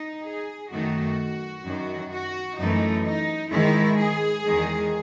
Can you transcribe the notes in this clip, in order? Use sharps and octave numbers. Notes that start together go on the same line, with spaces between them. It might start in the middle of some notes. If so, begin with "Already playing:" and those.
Already playing: D#4
G#4
F#2 D#3 A3 F#4
F#2 D#3 F#3
F#4
F#2 E3 A3 D#4
D#4
G#2 D#3 G#3 E4
G#4
E2 D#3 G#3